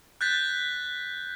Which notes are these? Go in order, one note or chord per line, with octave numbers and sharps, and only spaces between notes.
F#6 G6 A6 B6